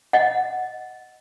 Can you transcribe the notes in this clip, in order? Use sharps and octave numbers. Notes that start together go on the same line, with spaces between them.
D#5 F#5